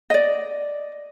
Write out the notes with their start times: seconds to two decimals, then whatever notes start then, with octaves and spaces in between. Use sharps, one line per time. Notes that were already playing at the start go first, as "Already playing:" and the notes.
0.10 D5 D#5